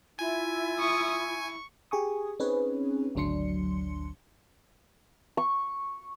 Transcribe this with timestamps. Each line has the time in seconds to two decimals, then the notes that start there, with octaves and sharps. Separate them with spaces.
0.19 E4 F4 G#5
0.79 C#6 D#6
1.12 C#6
1.91 G4 G#4 G#5 C#6 D#6
2.39 C4 C#4 D#4 G#4 B4 C#5
3.15 G#1 D2 F#3 D4 C6 C#7
5.37 C#6